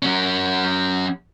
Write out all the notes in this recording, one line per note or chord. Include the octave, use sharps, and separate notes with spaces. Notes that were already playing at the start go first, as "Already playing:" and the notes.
F#3 C#4